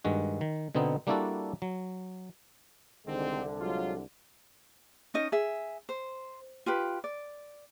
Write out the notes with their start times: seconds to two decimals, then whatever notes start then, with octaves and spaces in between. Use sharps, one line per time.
0.04 G2 D#3 G#3 F#4
0.41 D#3
0.75 B2 D3 B3 C4 D#4
1.07 G3 A#3 D4 E4 F#4 A4
1.62 F#3
3.07 C2 D3 D#3 G#3 C4
3.60 F#3 G#3 F4
5.14 C#4 D#4 D#5
5.32 G#4 E5
5.89 C5
6.66 F4 G4 B4
7.04 D5